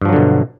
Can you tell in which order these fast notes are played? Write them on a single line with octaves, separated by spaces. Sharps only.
G2 F3 F#3 D3 B2